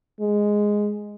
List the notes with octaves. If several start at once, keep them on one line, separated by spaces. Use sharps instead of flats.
G#3